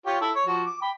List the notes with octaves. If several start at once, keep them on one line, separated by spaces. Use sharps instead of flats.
F4 G4 C#5
E4 A4
C#5
F3 F#4
D6
G5 B5